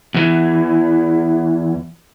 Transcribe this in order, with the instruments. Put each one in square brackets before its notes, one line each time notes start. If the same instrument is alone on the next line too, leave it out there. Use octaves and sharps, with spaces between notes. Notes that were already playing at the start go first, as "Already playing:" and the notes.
[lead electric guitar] E2 E3